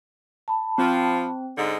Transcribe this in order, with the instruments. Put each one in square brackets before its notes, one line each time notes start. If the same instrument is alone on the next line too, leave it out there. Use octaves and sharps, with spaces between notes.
[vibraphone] A5 B5
[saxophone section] F3 [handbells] C4
[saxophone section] G#2 D3 G#3